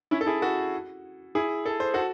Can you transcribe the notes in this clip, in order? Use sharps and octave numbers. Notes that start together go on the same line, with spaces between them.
C#4 E4
A4
E4 G#4
F#4 A4
E4 G#4
A4
C5
F#4 A4